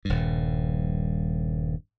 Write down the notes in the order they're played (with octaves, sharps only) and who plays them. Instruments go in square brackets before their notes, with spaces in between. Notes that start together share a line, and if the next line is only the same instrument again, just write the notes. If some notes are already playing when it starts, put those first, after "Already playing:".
[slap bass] D#1 G2